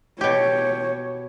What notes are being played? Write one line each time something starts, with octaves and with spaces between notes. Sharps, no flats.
B2 G4 C#5